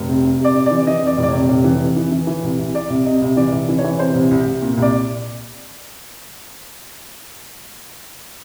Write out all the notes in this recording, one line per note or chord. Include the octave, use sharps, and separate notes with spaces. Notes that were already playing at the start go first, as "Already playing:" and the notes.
Already playing: F1
C3
C3
C3
D5
C3
E3 D5
E3 D#5
F2
D5
F1
D5
C3 C#5
F1
E3
F2
E3
E3
E3
C2
C2
C3 D5
C2
C3 D#5
C2
E3 D5
C2
E3
C#5
E3
C3 C5
C2
C2
C2
A#2
C2
D5